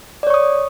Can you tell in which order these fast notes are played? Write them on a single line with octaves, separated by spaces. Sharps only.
D5 C#5 C#6 D#6